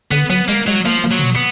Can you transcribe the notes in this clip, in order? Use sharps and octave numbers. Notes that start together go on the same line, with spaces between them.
D3 B3
F#3 B3
G#3 A#3
F#3 G#3
F3 A#3
A#3
F#3
D3
B2
B3